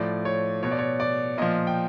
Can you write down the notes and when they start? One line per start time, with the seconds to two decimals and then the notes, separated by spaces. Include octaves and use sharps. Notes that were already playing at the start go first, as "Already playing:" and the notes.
Already playing: A2 F3 D5
0.25 C#5
0.63 B2 C#5
0.71 D5
0.78 C#5
1.00 D5
1.38 A#2 F3 D#5
1.67 G5